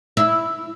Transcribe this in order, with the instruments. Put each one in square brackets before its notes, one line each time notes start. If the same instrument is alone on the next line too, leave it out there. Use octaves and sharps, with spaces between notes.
[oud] E4